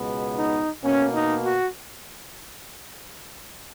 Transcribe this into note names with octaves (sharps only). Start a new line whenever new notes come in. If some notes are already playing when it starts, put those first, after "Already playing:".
Already playing: C#2 B2 G#3 B3
D#4
B2 A#3 C#4
D#4
F#4